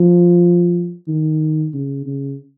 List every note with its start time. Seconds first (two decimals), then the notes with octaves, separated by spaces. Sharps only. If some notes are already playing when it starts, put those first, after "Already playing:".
Already playing: F3
1.08 D#3
1.74 C#3
2.06 C#3